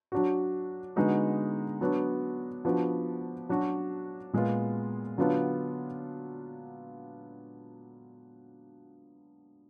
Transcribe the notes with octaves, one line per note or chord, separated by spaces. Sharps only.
F#3 D4 F#4
D3 G#3 B3 D#4 F#4
F#3 B3 D4 F#4
F3 B3 D4 F#4
F#3 D4 F#4
A#2 G#3 B3 F4
D3 F#3 B3 D4 F4